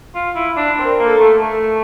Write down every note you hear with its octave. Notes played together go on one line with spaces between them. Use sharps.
F4
E4
D4
C4 A#4
A#3
A4
A3
A3